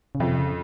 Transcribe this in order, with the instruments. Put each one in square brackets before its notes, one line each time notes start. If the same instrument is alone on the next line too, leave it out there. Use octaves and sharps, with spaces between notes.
[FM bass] C#3
[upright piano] F2 [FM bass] C3
[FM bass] C#3